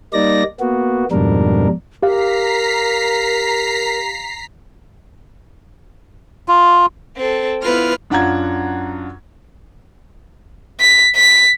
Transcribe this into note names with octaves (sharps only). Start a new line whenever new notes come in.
G3 A#3 D#4 D5 A#6
A#3 B3 F#4
F2 G#2 B2 G3 D4 A#4
G4 A#4 F5 A#5 B6 C7
F4
C4 A4
B3 E4 F4 B4 F6
F#2 D4 F4 F#5 A#5 G#6
B6
B6